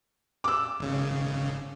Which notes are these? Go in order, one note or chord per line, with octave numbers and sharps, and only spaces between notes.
D6 E6
G#1 C#3